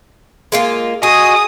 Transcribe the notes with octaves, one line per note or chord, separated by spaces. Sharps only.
G#3 A#3 F4
F#4 G#4 D#5 G#5 D#6